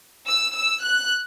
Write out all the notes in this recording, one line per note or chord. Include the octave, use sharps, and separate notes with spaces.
E6
E6
F#6